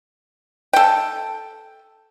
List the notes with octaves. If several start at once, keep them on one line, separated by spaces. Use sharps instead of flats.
A4 G5